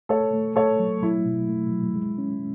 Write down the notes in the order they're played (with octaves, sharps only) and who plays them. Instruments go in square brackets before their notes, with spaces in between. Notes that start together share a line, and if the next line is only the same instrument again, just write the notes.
[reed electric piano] A3 [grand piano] A4 C#5
[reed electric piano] A3
[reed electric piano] A3 [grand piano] A4 C#5
[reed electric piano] F#3
[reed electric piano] F#3 [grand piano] E4
[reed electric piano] B2
A3
F#3
G#3
C#4